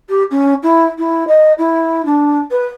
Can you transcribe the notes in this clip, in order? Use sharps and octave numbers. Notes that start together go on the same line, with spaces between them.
G4
C#4
E4
E4
D#5
E4
D4
B4